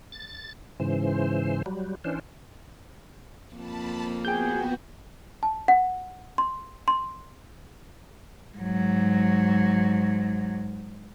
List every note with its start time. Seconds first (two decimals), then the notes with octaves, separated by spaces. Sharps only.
0.12 A6
0.80 G#2 C#3 E3 C5
1.66 F#3 G3
2.04 E3 C#4 D4 C5
3.55 F2 A#3 A5 B5
4.25 B3 F#4 G#4 G5 G6
5.43 A5
5.68 F#5
6.38 C6
6.88 C6
8.58 G#2 F#3